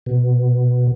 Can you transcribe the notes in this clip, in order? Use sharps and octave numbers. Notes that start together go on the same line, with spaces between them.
B2